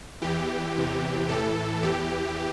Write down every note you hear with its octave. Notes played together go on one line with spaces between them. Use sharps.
E2 E3 G4
E2 C3 E3
A2 E3 A4
E2 E3 G4